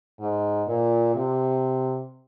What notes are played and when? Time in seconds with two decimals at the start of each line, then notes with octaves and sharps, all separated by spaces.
0.20 G#2
0.68 A#2
1.15 C3